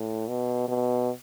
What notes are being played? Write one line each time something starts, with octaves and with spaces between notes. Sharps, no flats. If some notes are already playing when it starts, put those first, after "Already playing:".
Already playing: A2
B2
B2